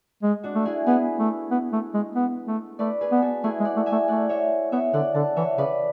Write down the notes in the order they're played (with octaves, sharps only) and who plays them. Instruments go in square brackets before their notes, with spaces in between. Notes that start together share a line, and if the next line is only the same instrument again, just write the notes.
[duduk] G#3
[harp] D4 F#4
[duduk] A3
[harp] E4 G#4
[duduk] B3 [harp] G#4 B4
[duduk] A3
B3
A3
G#3
B3
A3
[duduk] A3 [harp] B4 D5
[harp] G#4 B4
[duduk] B3
[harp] F#4 A4
[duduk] A3 [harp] E4 G#4
[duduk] G#3
[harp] D5 F#5
[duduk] A3
[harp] E5 G#5
[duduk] A3
[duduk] A3 [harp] D5 F#5
[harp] C#5 E5
[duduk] B3 [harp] C#5 E5
[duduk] D3 [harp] D5 F#5
[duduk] D3 [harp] F#5 A5
[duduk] E3 [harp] C#5 E5
[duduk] C#3 [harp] B4 D5